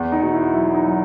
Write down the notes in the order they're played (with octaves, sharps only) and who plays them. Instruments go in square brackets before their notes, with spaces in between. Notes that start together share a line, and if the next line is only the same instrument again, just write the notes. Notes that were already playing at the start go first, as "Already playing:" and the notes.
Already playing: [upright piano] E2
D#4
B2
E4
F#3 E4
D#4
F#3